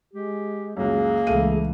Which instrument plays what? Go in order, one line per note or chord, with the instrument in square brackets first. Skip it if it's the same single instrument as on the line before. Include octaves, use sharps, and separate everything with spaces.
[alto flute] G#3 [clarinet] G4
[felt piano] C#2 F#2 [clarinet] A#3 [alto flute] G#4
[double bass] C#2 E3 [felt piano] A3 F5 D#7